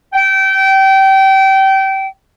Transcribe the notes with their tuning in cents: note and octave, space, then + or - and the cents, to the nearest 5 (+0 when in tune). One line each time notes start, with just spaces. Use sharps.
G5 -25